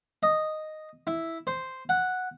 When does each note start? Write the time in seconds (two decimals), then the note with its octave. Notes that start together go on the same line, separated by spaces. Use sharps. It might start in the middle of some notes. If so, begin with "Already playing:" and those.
0.23 D#5
1.07 E4
1.47 C5
1.89 F#5